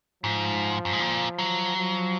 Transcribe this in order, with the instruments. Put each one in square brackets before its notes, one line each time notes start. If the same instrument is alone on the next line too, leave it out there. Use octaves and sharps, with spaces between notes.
[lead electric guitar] G#2 [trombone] F3
[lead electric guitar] F#2
G#2
A#2
F#3
[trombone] F3